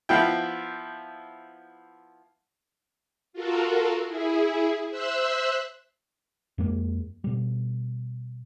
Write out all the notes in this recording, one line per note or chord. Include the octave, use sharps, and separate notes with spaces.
F3 B3 E4 G5
F4 F#4 A4 A#4
E4 G#4
C5 E5 E6 F#6
F2 G#3 A#3
B2 G3